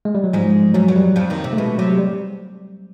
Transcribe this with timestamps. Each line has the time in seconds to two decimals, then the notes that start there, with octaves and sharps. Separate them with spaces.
0.05 G#3
0.15 G3
0.24 F#3
0.33 G#2 F3 G#3
0.74 G#2 F#3 G#3
0.88 F#2 F#3
0.96 G3
1.16 F2 F3
1.30 D#2 D#3
1.44 C3
1.53 A3
1.57 B2 G#3
1.78 C3 F#3
1.98 G3